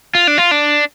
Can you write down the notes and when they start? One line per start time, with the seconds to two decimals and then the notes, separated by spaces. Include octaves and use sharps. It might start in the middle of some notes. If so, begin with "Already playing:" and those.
0.15 F4
0.27 D4
0.38 F4
0.51 D4